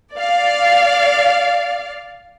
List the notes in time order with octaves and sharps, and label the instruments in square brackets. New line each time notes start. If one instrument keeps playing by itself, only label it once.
[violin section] D5 F5